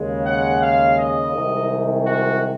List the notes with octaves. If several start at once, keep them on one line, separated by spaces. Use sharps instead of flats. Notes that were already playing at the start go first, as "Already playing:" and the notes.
Already playing: D#2 C#3 G#3
F#5
F5
D#5
C2 C3 D#3 G#3
F#4